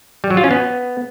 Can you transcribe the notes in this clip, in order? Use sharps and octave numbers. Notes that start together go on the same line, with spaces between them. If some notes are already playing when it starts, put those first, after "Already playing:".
G3
F#3
F4
C#4
B3